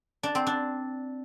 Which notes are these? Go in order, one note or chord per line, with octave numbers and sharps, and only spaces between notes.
D4
C4
D4